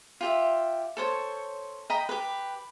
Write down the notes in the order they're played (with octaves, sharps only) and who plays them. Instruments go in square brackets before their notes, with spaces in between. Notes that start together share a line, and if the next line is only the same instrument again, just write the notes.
[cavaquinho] F4 G4 E5
A4 C5 C#5
D#5 G5 A#5 B5
G4 B4